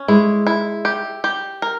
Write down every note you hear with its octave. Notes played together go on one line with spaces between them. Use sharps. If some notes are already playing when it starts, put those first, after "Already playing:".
Already playing: C#4
G#3 E4
E4
G4
G4
A#4